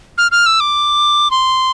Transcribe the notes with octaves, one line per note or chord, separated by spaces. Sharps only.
F6
F6
E6
D6
C6